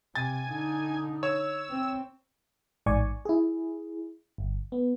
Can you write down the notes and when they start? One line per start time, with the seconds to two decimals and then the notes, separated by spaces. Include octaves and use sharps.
0.15 C3 G#5 A6
0.50 D3 D#4
1.23 C#5 E6
1.70 C4
2.86 A1 G#2 D5 G#5 C#6
3.25 E4 G#4
4.38 G1
4.72 B3